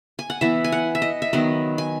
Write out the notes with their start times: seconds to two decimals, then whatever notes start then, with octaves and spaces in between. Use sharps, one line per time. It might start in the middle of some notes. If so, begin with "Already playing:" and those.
0.19 G#5
0.30 F#5
0.41 E3 B3 E5
0.64 G#5
0.72 F#5
0.95 E5
1.02 D#5
1.22 E5
1.33 D#3 F#3 B3 D#5
1.78 G#5